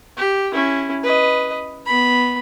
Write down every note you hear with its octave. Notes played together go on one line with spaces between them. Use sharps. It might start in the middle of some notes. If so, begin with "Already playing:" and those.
G4
C#4 E4
B4 D#5
B3 B5